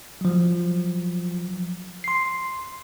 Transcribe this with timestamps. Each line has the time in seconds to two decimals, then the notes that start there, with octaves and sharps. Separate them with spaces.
0.21 F3 F#3
2.04 C6 C7